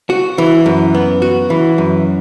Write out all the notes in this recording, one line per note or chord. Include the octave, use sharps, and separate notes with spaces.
F#4
E3
F#2
B3
F#4
E3
F#2